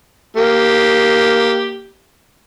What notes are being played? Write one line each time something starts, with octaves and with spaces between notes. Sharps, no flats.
A#3 G4